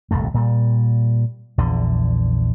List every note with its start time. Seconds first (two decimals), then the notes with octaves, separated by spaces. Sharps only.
0.11 D#1 C2 F2 A3
0.34 A#2 G3
1.58 A#1 E2 D3